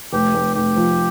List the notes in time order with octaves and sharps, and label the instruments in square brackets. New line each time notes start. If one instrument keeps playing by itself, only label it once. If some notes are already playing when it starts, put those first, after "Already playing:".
[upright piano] F1 [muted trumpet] G4
[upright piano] F1
[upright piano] F1 [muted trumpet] G4
[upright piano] F3